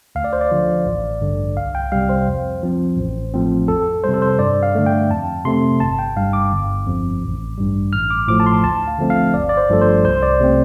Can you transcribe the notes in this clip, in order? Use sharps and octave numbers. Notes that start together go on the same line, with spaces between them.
D2 F5
D5
C5
D5
D3 F3
A1
G2 D3
C2 F5
G5
C3 G3 F5
C5
F2
F3 C4
A1
A2 F3 A3 C4
F2 A4
C3 G3 C5
A4
C5
G2 D5
F5
D3 A3
G5
F2 A5
C3 A3 C4 C6
G1 A5
G5
G2 G3 F5
D6
G1
F2 F3
A1
G2 G3
A1 F6
D6
A2 F3 A3 D6
A5
C6
D2 A5
F5
D3 F3 A3 C4
F5
G1 D5
D5
C5
G2 F3 A3 A4
C5
C2 C5
D5
C3 A3 C4